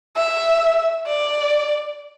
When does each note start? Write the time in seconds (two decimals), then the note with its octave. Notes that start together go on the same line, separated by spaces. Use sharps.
0.16 E5
1.07 D5